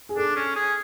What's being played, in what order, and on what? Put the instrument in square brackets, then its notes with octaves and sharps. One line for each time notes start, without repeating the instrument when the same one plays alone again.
[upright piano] G#4
[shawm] D4 [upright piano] A4
[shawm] C#4
G#4